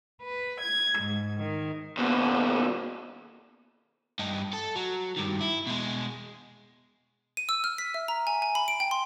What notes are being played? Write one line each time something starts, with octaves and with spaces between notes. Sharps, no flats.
B4
G#6
G#2
D#3
D#2 B2
G2 D#4
A4
F#3
G2 D#3
E4
B2 G#3
D#7
E6
F6
B6
E5
A#5
G#5
G#5
B5
D7
G5
C6